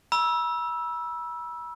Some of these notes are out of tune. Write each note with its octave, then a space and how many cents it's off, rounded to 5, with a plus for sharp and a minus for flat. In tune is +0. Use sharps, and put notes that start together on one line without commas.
B5 -40 E6 +0